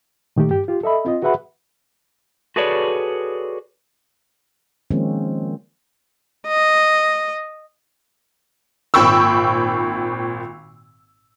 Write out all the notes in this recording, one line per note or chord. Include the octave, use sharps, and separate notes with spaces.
A#2 D#3 A3 G4
G2 G4
F4 G4
A4 D#5 E5 B5
C4 F4 D#5
F#4 G#4 B4 E5 F#5 B5
F#4 G#4 A4 B4 C#5 D5
D#3 F3 G#3 A#3 C4 C#4
D#5
G#1 A#2 G5 B5 C#6 E6